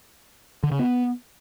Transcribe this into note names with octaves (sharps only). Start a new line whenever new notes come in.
D3
C#3
B3